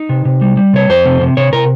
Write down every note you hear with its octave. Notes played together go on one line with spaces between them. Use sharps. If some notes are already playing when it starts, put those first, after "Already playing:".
Already playing: D#4
C3
C3
G3
G3
C3 C#5
F2 C5
C3
C3
C3 C#5
C3 A#4